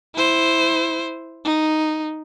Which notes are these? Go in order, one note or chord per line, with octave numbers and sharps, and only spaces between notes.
E4 C5
D#4